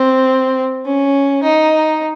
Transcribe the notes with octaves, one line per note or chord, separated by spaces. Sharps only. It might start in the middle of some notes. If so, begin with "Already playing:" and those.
Already playing: C4
C#4
D#4